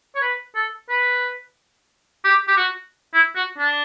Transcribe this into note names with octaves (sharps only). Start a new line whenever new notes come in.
C#5
B4
A4
B4
G4
G4
F#4
E4
F#4
D4